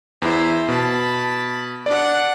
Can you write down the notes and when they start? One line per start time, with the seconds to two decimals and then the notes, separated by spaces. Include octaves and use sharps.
0.22 E2 E4 C5 E5
0.69 B2 A5 B5
1.86 D4 D5 F#5